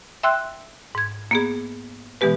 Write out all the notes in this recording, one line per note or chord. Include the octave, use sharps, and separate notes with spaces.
E5 G5 C6 E6 F#6
G#2 G#6
A#3 B3 G#4
B2 E3 G#3 B3 G4 B4